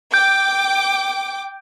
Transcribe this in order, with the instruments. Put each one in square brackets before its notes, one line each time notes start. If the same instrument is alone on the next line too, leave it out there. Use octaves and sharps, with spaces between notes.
[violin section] G5 D6 [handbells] G6